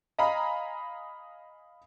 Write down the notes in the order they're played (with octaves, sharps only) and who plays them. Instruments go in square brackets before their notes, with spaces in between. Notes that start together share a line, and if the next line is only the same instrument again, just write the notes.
[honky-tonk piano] D#5 F5 G#5 A#5 B5